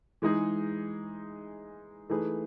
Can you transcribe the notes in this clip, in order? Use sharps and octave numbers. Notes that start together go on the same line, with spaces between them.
E3 G#3 D#4 G#4
E3 A3 D#4 G#4 B4